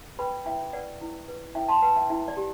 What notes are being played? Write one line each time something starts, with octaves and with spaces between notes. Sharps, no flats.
B4 G5 B5
E4 E5 G5
B4 D5 F#5
E4
B4
E4 E5 G5
A5 C6
B4 F#5 A5
E5 G5
E4 E5
D5
G4